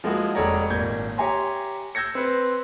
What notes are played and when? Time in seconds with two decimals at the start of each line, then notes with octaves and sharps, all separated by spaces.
0.04 F3 G#3 A#3 E4 F#4
0.35 F1 G#3 A4 C#5 D5 A#5
0.70 G#1 A#2 D5 G6 G#6
1.18 G4 C#5 E5 G#5 A#5 C6
1.95 E6 G6 G#6 A#6 C#7
2.15 C4 B4 C5